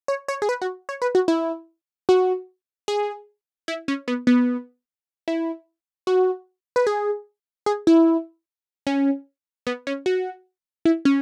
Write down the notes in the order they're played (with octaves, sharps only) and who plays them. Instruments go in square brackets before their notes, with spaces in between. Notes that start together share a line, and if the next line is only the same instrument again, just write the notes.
[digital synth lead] C#5
C#5
G#4
B4
F#4
C#5
B4
F#4
E4
F#4
G#4
E4
C#4
B3
B3
E4
F#4
B4
G#4
G#4
E4
C#4
B3
C#4
F#4
E4
C#4